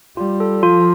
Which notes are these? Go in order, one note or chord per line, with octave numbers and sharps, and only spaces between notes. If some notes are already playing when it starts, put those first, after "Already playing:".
G3 F4
A4
F3 F4